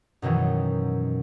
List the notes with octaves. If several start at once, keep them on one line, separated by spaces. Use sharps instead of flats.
F#2 B2 D#3 E3 F#3